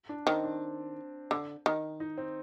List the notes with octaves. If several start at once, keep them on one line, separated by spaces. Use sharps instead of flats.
D4
D#3 C4
D4
D3
D#3
D#4
C4